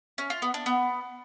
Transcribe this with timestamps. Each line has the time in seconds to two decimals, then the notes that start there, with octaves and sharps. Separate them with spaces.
0.18 C#4
0.30 F4
0.42 B3
0.54 D4
0.66 B3